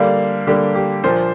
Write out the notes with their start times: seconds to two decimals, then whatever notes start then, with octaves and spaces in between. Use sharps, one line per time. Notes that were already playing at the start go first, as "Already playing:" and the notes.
Already playing: D3 G3 A#3 D4 F5
0.47 D3 G3 A#3 D4 G4
0.75 G4
1.04 A#2 F3 A#3 D4 C5